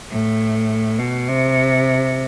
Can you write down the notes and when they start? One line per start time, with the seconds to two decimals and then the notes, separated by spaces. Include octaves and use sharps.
0.10 A2
0.98 B2
1.28 C3